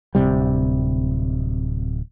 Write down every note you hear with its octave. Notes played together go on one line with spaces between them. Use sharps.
D1 C3 G3